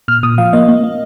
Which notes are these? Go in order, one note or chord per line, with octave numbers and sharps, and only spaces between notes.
A#2 F6
A#2 D#6
F3 F5
A#3 D#5
A#3
A#3